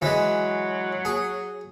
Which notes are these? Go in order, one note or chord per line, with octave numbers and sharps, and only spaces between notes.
E3 F#3 G#3
G#4